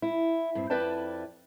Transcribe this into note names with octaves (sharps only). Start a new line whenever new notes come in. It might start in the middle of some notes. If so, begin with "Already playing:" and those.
E4
G2 C4
F2 E4 B4 D5 G5 A5